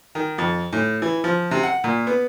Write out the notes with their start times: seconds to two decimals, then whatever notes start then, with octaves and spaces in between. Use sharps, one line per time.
0.15 D#3
0.38 F2
0.73 A2
1.02 E3
1.24 F3
1.51 C3
1.63 F#5
1.84 A#2
2.07 B3